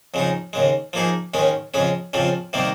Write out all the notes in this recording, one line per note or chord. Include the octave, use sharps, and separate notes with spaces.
F2 C#3 G#3 D#4
D#2 C#3 G#3
F3 A#3 D#4 G#4
D#2 D#3 G#3 C#4
F2 C#3 G#3 C#4
F2 C#3 F3 C4
C3 D#3 G3 A#3